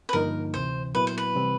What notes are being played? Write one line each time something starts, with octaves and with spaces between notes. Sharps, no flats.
B4
G2 D3 F3 A#3 D#4 A#4
D2 C3 E3 C5
A#2 F#3 B3 E4 B4
C5
B4
C3 E3 G3 C4